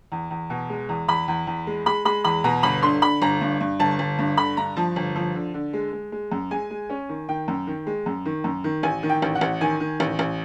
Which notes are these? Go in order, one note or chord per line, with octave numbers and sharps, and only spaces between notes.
E2
E2
B2
G#3
E2
E2 B5
E2
E2
G#3
G#3 B5
G#3 B5
E2 B5
B2 A#5
G1 B5
D3 C6
D3 B5
G1 A#5
G2
G2
G1 A5
G1
G2
D3 B5
G2 A#5
F3 A5
G1
F3
D3
D3
G#3
G#3
G#3
F#2
G#3 G#5
G#3
C#4
D#3
D#3 G5
F#2
D#3
G#3
F#2
D#3
F#2
D#3
A1 G#5
D#3
G5
A1
F#5
A1
D#3 G#5
D#3
A1
A1